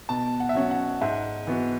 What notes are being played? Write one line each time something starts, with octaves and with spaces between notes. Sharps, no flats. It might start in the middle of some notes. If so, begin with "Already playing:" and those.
B2 A5
F#5
E5
F#3 C#4 F#5
F#5
G#2 E5
E3 B3 F#4